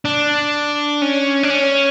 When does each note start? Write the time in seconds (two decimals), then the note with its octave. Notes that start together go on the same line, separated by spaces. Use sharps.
0.05 D4
1.02 C#4
1.43 D4
1.50 C#4